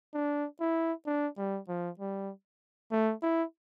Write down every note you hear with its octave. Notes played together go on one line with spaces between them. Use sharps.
D4
E4
D4
G3
F3
G3
A3
E4